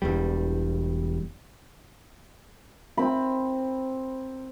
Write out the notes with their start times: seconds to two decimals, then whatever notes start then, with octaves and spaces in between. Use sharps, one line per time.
0.02 E1 E2 G3
2.97 C4 B5